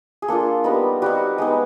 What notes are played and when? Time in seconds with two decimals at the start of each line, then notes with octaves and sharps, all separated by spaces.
0.22 G#4
0.28 A#3 D4 F4 A4
0.64 G3 B3 D#4
1.02 G3 C4 D#4 F#4
1.38 G#3 B3 D#4